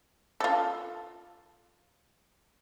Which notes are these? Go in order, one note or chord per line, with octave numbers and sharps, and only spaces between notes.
F4 A4